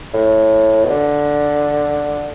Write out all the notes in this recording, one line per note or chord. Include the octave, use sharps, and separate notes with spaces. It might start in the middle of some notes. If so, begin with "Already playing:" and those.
A2
B2
D3